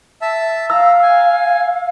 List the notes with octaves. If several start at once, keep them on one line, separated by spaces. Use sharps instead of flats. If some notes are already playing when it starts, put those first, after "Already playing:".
E5 A5
F5 A#5 E6
G#5